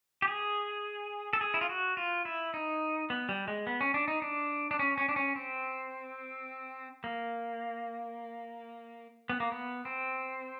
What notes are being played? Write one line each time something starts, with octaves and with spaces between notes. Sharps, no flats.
G4
G#4
A4
G#4
E4
F4
F#4
F4
E4
D#4
B3
G3
G#3
B3
C#4
D4
D#4
D4
D4
C#4
C#4
D4
C#4
C4
A#3
B3
A#3
B3
C4